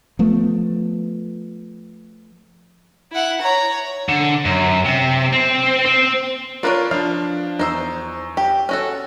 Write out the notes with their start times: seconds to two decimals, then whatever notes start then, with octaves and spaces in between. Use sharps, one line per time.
0.19 F3 A3 B3
3.12 E4 F#5
3.41 C#5 A#5
4.09 D3
4.45 F#2
4.85 C3
5.33 C4
5.85 C4
6.63 D4 F4 A#4 B4 C#5 D5
6.91 F3 D4 F5
7.59 E2 D#4 C5 E6
8.37 G4
8.69 C#4 F#4 A4